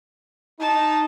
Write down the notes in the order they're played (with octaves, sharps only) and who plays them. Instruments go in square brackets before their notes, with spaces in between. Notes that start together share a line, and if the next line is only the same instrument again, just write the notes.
[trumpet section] D#4 [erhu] A5